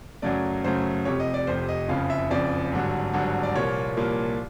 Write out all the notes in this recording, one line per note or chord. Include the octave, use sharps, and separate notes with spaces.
F#2 C#3 F#3 A3 D5
F#2 C#3 F#3 A3 C5
F1 F2 C3 C#5
D#5
D5
F1 F2 C3 C5
D#5
F#1 F2 C#3 F3 F5
E5
F#1 F2 C#3 F3 D5
G#1 G2 D3 F#3
G#1 G2 D3 F#3
D5
C2 A#2 F3 A#3 C#5
C2 A#2 F3 A#3